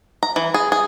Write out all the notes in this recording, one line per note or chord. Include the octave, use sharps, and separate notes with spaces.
A#5
E3
G#4
G#4